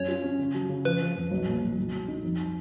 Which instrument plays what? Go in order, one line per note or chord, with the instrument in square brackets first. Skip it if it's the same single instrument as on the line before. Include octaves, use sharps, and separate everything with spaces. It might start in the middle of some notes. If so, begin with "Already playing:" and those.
Already playing: [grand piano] F#2 C#4 [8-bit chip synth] C#5
[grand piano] F4
C#4
C#3
F#3
C#3
[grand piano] F3 [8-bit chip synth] B4
[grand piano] F3
F2
B1
A#2
B1
B1
B1
D#4
F2